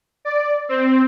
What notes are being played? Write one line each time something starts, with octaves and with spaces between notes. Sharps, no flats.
D5
C4